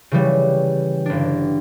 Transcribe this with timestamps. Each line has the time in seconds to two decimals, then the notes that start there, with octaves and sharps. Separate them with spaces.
0.11 C#3 E3 G3
1.06 G1 D4